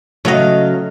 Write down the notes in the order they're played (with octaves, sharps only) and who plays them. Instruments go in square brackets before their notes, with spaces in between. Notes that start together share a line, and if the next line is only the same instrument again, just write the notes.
[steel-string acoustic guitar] C#3 F#3 F5 [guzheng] A3 D#5